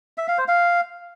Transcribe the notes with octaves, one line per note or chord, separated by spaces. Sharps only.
E5
F5
C5
F5